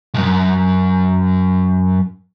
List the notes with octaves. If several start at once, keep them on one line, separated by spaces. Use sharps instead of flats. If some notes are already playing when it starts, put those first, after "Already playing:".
B1 F#2